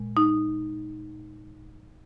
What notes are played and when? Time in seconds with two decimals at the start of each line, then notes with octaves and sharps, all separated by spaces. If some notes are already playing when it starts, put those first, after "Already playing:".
Already playing: A#2 G#3
0.17 D#4